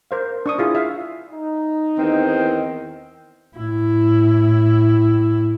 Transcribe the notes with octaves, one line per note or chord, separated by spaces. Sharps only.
A#4 C5 F5
D4 C#6 D#6
E4 F4 G#4
E5 F5
D#4
E2 D#3 C4
A2 E4